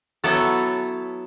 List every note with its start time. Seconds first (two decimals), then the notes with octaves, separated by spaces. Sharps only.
0.24 F#3 B3 E4 A4 C#5